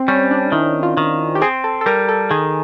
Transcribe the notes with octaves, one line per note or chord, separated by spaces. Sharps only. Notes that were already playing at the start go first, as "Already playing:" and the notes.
Already playing: C4
G3 C#4
D4
D#3 E4
F4
D#3
G4
C4 G#4
A4
A4
G3 A#4
A4
D#3 G#4